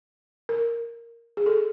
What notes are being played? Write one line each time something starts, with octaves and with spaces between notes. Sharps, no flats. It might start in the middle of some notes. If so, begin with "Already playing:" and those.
A#4
G#4
A4